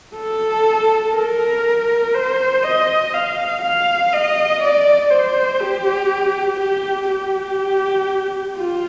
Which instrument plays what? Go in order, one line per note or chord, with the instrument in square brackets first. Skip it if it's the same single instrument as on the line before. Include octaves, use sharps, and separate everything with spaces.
[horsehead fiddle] A4
A#4
C5
D#5
F5
F5
D#5
D5
C5
G4
G4
G4
F4